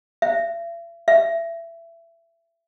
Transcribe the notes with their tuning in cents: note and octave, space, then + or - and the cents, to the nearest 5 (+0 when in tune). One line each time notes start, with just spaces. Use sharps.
E5 +45
E5 +25